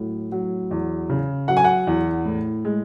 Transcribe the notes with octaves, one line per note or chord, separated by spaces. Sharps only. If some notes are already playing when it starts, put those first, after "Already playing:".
Already playing: A2 F#3
F#3
E2
C#3
F#3 F#5
G#5
F#5
E2
A2
G#3